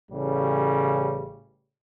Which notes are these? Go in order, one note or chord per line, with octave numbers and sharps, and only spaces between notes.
A1 A2 C#3 G3